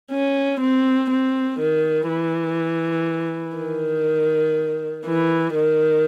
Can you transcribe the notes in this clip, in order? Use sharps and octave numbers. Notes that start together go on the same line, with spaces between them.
C#4
C4
C4
D#3
E3
D#3
E3
D#3